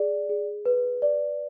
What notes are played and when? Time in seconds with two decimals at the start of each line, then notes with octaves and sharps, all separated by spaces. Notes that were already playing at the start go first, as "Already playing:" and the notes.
Already playing: G#4 D5
0.29 G#4
0.65 B4
1.02 D5